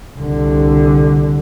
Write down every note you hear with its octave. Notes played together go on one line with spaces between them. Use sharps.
C2 D3